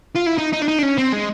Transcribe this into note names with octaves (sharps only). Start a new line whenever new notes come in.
F4
E4
D#4
D#4
D4
D#4
D4
C#4
C4
G#3